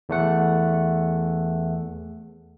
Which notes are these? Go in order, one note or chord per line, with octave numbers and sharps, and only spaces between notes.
E2 A3 F#5